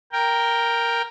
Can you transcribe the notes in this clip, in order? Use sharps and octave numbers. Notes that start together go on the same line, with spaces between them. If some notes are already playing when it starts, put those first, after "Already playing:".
A#4 G5